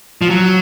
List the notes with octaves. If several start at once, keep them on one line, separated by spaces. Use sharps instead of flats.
F3
F#3